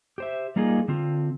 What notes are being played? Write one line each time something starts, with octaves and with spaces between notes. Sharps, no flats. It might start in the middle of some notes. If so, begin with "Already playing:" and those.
G4 C5 E5
G3 A#3 D#4 F4 G#4
D3 C4 F4